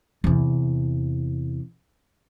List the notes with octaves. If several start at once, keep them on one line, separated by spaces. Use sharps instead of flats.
E2 C3